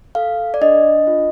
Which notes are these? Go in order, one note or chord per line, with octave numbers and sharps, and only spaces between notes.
A4 F5
D5
D4 D#5
F4